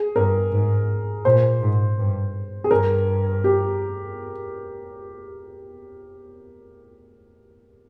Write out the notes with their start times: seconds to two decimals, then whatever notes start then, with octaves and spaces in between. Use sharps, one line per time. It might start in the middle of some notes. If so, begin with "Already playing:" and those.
Already playing: G#4
0.16 G2 A#4
0.52 G#2
1.25 A#2 C5
1.61 G#2
1.98 G2
2.64 G#4
2.71 G2 A#4
3.44 G4